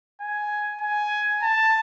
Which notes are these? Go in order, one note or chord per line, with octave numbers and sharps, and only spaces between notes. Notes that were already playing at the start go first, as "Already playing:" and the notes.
G#5
G#5
A5